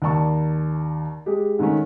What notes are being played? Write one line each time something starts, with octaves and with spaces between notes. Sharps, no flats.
D#2 D5 A5 C#6
G#3 G4
G#2 D#3 A3 C#4